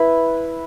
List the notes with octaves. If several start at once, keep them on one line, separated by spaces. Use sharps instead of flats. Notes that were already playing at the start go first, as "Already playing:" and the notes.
Already playing: E4 B4